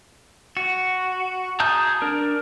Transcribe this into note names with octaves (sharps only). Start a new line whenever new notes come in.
F#4
G#4 A5 A#5 D#6 G6
D4 A#4